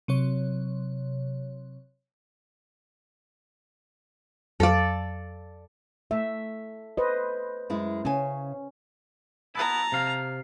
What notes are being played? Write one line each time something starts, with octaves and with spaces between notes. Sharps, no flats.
C3 F#3 C#5
F2 F#3 A4 D5 F5
A3 E5
B4 C5 D#5
F#2 G#3 E4
C#3 C#4 G#5
B3 E4 A5 A#5
C3 F5